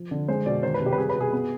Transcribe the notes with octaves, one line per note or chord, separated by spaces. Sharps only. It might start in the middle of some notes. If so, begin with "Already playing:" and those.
Already playing: F3
D3
G#3 C5
B2 D5
D#3 C5
B4
C3
G4
B4
G3 G#4
B4
B2
G#4
B3